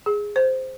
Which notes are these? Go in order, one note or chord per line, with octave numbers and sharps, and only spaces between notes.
G#4
C5